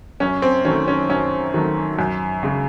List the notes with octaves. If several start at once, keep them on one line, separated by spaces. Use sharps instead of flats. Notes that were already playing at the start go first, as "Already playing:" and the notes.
F#2 C#4
C4
D#3 F#3 A3 C#4
C#4
F#2 C#4
D#3 F#3 A3
F#2
C#3 G#3